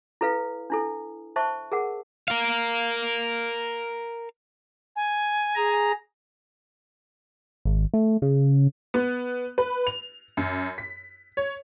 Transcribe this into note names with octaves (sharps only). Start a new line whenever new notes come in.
E4 A4 B4 F5
D4 E4 A4
C5 E5 A5 C#6
G#4 A#4 F#5
A#4 F5
G#5
G#4 A#5
G#1
A3
C#3
B3
B4
F7
F#2
B6
C#5